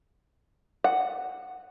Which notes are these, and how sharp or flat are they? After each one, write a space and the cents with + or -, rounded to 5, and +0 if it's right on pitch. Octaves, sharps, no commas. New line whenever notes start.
F#5 +0